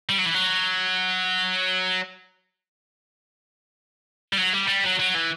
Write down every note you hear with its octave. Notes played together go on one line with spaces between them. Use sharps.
G3
F#3
E3
F#3
G3
F#3
G3
G3
F#3
F#3
E3